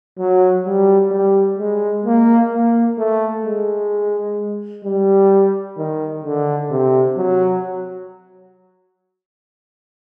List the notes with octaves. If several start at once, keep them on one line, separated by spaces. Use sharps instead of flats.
F#3
G3
G3
G#3
A#3
A#3
A3
G#3
G3
D#3
D3
C3
F#3